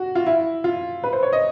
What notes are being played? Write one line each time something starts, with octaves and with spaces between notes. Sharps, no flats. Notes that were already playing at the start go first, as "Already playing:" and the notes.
Already playing: F#4
F4
E4
F4
B4
C5
C#5
D#5